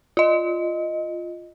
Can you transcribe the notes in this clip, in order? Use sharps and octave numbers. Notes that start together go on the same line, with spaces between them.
F4 D#5